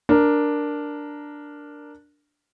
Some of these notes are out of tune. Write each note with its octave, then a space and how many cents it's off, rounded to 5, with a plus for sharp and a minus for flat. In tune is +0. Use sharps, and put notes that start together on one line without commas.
D4 +0 A#4 +0